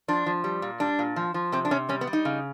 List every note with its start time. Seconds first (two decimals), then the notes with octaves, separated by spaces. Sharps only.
0.08 F3 D4
0.26 F3
0.44 G3
0.62 A#2
0.80 G3 D4
0.99 A#2
1.16 F3
1.34 F3
1.52 C3 C4
1.65 D4
1.71 C3 C#4
1.89 G3 C#4
2.01 B3
2.07 G3
2.13 D#4
2.25 C#3